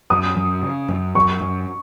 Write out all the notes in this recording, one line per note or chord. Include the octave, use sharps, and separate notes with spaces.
F#2 D#6
F#2
C#3
F#2
F#2 C#6
F#2